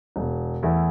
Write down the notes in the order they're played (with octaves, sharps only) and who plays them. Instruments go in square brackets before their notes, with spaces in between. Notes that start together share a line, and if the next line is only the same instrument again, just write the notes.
[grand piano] E1
E2 E3 A3 E4